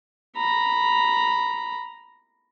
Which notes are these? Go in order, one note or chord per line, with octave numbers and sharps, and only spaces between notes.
A#5 B5